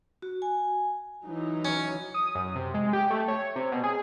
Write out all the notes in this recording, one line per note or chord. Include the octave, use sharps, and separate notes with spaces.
F#4
G#5
E3 F#3 D#4
C#4
D#6
F#2
C3
G#3
G4
A3
C#5
C3
B2
G#4